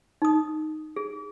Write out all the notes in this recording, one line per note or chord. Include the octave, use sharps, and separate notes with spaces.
D#4 D#6
G#4